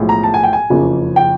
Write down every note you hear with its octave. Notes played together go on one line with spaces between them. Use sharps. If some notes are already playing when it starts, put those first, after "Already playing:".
Already playing: B1 A2 F3 G#3
A#5
A5
G#5
G5
G#5
F#1 F2 C#3 F3
G5